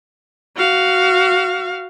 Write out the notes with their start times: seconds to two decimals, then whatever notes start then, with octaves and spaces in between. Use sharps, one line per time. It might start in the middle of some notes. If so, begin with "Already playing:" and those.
0.57 F#4 F5